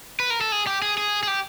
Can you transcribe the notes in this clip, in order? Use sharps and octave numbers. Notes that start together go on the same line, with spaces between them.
B4
A#4
A4
G#4
G4
G#4
G#4
G#4
G4